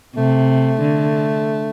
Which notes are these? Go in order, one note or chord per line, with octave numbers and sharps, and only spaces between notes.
C3 A3
D3